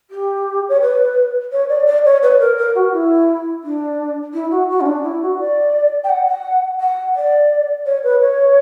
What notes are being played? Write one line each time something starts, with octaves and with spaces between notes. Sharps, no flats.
G4
C#5
B4
C#5
D5
D5
C#5
B4
A#4
A#4
F#4
E4
D4
E4
F#4
F#4
C#4
D4
E4
F#4
D5
G5
F#5
F#5
F#5
D5
C#5
B4
C#5